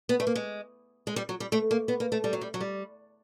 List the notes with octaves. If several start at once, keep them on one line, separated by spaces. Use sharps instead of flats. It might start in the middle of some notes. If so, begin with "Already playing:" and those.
B3
A3
A#3
G#3
G#3
G3
F#3
G3
A3
A#3
B3
A#3
A3
G3
F#3
G3
F#3
G3